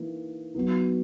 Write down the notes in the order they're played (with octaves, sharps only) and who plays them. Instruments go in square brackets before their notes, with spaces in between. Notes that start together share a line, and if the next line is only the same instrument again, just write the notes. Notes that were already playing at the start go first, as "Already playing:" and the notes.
Already playing: [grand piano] E3 A#3 D#4
F#3 B3 D#4